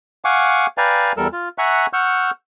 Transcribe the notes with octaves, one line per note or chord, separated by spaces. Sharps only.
F5 F#5 G#5 C#6 D6
B4 D5 F5 G5 G#5 A#5
E2 G3 A4 A#4 E6
F4
E5 F#5 G#5 A#5 C#6 F#6
F#5 C#6 E6 F6 G6